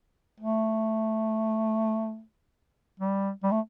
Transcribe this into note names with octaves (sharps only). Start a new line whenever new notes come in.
A3
G3
G3
A3